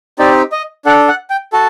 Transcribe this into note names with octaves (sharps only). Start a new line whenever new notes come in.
C4 D#4 G4 D5
D#5
D4 A4 F#5
F#5
G5
F#4 A4 A5